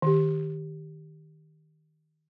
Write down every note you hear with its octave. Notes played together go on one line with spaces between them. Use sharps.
D#3 G4